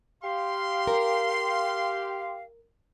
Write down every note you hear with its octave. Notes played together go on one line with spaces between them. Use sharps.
G4 F5 C6
A#4